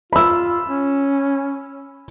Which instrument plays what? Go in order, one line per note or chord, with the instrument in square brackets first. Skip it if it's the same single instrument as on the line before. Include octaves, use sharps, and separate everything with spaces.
[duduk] F4 [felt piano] B5 E6
[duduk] C#4